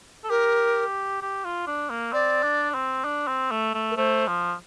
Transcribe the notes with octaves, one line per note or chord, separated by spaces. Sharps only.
A4
G4 A#4
G4
F4
D4
A#3
C4 D5
D4
C4
D4
C4
A3
A3
A#4
A3 C5
F3